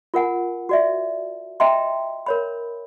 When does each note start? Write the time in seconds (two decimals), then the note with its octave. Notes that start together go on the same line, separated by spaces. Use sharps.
0.14 F4 A#4 F#5 G#5
0.69 F#4 D5 E5
1.60 D#5 E5 G5 A#5 C6
2.26 A#4 C#5 B5